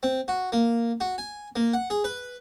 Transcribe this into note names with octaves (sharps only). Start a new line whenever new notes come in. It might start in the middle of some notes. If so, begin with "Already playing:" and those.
C4
F#4
A#3
F#4
G#5
A#3
F#5
G#4
B4